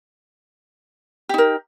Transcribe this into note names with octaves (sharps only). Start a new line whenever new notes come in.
D#4 G4 A#4